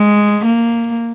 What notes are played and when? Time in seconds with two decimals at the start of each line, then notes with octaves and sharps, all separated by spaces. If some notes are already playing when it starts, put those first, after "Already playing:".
Already playing: G#3
0.45 A#3